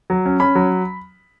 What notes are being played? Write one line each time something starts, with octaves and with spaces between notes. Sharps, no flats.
F#3
C#4
C#4 B5
F#3